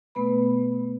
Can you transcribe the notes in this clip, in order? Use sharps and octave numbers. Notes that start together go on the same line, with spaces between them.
B2 A3 B3 B4 B5